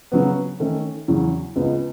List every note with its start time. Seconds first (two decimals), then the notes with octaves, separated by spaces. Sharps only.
0.12 C#3 F#3 B3
0.60 D#3 A3 C#4
1.08 E2 C#3 F#3
1.56 C#2 C#3 G#3 B3